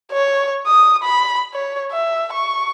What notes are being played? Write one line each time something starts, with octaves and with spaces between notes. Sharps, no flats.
C#5
D#6
B5
C#5
E5
C#6